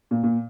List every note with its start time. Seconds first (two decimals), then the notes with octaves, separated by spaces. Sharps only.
0.11 A#2
0.23 A#2